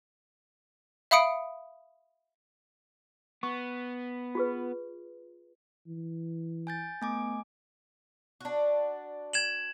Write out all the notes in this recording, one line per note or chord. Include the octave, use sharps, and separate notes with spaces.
E5 F5 B5 D#6 C#7 D7
B3 C#6
F4 G#4 B4
E3
G#5 G6 A6
A3 B3 G#5 D6
D4 F#4
G#6 E7 F#7